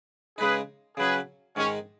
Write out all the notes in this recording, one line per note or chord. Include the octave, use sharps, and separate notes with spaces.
C#3 G#3 D#4 G#4 B4
C#3 F#3 C#4 G#4 B4
G#2 D#3 G#3 C#4 D#4